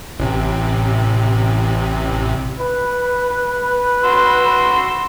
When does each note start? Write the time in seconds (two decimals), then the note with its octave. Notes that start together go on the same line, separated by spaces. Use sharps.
0.19 A1 C3
2.60 B4
4.05 F#4 C6 E6